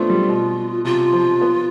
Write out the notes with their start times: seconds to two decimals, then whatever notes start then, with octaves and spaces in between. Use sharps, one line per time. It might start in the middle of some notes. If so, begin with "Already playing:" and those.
Already playing: A3 B3 C4 D4 F4
0.10 G3
0.29 B2
0.85 C3 F4
1.13 F3
1.41 B3